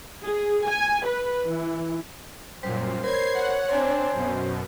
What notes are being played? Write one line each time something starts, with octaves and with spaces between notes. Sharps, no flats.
G#4
G#5
B4
E3
F#2 A#2 G3 C5
A#4 C5 C#5 B5 G#6 C7
F#5
C4 D4 C5 G#5 A#5 C6
F#2 B2